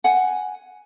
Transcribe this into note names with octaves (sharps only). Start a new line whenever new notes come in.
F#5 G#5